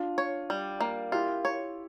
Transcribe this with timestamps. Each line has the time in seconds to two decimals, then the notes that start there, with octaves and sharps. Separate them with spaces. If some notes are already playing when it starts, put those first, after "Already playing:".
Already playing: D4 F4
0.18 C#5
0.50 G3
0.81 A#3
1.12 E4 F4 G4
1.45 C#5